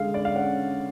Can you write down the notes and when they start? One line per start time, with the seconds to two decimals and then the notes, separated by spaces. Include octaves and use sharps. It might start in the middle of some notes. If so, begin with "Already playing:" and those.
Already playing: D3 G#3 F5
0.14 D5
0.25 F5
0.36 C#4 F#5